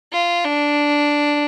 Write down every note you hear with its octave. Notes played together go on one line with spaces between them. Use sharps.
F4
D4